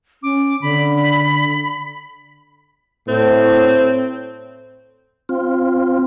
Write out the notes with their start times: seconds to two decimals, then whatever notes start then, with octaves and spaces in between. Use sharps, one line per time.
0.23 C#4 D6
0.62 D3 B5
3.08 A2 C4
5.29 C4 F4